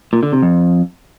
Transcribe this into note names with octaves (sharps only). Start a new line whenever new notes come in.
A#2
D3
C3
F2